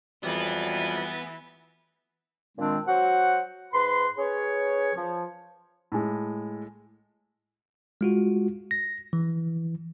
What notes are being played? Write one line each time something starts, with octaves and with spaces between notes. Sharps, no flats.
F2 E3 F#3 G3 B3
A#2 D#3 G#3 C4 D4
F#3 F#4 C5 F#5
G#2 B4 B5 C6
C#4 G#4 B4 C#5
F3
A2 G#3
G#3 F4 F#4
A#6
E3